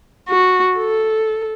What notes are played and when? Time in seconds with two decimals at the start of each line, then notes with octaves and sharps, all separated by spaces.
0.29 F#4
0.78 A4